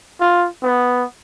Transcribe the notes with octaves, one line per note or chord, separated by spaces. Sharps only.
F4
B3